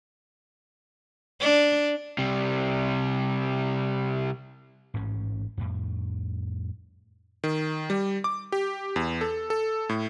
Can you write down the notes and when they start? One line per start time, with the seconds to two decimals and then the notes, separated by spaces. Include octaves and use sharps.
1.41 D4
2.18 C3 G3
4.94 A1 G#2 C#4
5.58 F2 A2
7.44 D#3
7.90 G3
8.24 D6
8.52 G4
8.96 E2
9.21 A4
9.50 A4
9.89 A2